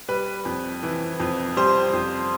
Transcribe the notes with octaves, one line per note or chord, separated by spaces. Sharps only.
G3 B4
F2
E3
F2
G3 C5
F2